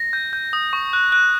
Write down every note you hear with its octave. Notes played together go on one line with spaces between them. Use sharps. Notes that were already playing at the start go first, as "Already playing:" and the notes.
Already playing: A#6
G6
G6
D#6
C#6
F#6
F#6